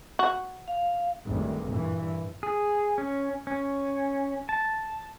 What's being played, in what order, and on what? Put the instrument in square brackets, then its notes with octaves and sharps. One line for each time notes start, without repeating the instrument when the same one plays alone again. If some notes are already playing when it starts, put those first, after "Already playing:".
[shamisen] F#4
[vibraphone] F5
[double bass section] G#1 D2 G2
G2 A#2 E3
[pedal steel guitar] G#4
C#4
C#4
A5